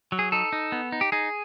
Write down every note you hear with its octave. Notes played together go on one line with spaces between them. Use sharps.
F#3
G#4
D#4 A4
D#4
B3
D#4
G4
D#4 G#4